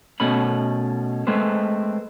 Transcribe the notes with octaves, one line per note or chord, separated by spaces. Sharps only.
B2 A3 C#4 B5
G#3 A3 C4 B4 C5